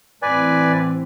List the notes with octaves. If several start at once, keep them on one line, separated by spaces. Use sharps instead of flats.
A2 E3 C4 B4 D5 G#5